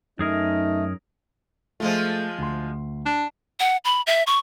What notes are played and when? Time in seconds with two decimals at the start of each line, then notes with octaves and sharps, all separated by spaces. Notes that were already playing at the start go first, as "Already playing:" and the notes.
0.19 F#2 A3 D#4 G#4 A#4
1.80 F3 G#3 A3 F4
2.38 D2 C6
3.06 D4
3.60 F#5
3.85 B5
4.07 E5
4.27 C#6